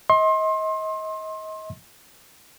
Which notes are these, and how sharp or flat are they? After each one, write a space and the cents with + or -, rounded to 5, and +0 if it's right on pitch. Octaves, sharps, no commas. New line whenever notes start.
D#5 +35 C6 +30